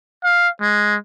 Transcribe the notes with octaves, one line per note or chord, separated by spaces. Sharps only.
F5
G#3